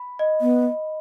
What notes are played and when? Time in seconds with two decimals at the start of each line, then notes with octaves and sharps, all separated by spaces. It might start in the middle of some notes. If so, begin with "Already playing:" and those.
Already playing: B5
0.19 D#5
0.41 B3